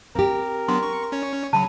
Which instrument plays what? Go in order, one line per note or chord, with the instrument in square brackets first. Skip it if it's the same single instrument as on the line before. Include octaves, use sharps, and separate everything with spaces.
[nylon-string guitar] C4 G4 [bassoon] A#4
[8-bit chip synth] F#3 B3 D4 [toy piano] C6
[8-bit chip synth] C#6
C#4 C#5
[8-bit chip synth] C#3 F#3 [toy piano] A5 B5